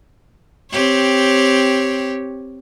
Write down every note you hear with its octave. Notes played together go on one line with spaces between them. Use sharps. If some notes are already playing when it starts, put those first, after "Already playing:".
C4 G4 C#5